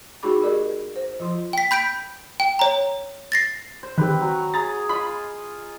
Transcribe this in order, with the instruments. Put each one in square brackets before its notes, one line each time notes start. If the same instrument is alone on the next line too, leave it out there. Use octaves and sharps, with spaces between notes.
[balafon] A3 D#4 F#4 G#4 B5 D6
G4 G#4 A#4 D5 D#5
C5
F3 F4 C6
[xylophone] G5 B6
B5 G6 B6 D7
G5
C#5 A#5
A6 A#6 C7
[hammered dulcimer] C5
[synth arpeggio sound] D#3 G4 [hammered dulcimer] C4 B4
[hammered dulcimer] F#3 A#5 C#6
[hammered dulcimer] G#4 [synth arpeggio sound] A#5 A6
[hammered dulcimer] F4 D#5 C6 [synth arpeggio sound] B5